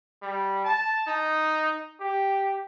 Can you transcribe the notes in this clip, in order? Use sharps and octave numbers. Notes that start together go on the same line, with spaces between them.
G3
A5
D#4
G4